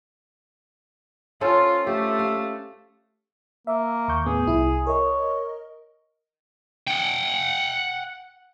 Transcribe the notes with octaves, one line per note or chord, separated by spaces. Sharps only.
C#4 F4 A4 C5
A3 G4
F5
A#3 E5
D#2 C#6 G6
A2 B3 G#4
C2 E4
A#4 C#5 D#5
F#5 G5